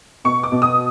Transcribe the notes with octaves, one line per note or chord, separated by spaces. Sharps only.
B2 C#6
D6
B2
D#6